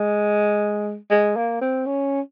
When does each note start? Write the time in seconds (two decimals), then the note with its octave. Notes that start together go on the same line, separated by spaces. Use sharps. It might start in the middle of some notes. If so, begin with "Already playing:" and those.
Already playing: G#3
1.10 G#3
1.36 A#3
1.61 C4
1.86 C#4